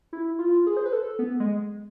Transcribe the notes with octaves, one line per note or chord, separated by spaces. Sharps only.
E4
F4
G#4
C5
B4
A4
B3
G#3